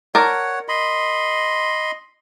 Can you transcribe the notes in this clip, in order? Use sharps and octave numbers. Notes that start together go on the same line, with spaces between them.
A#4 C#5 D5 F#5 A5
D#5 B5 C6